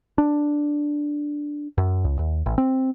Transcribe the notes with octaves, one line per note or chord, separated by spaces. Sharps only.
D4
F#2
C#2
D#2
A1
C4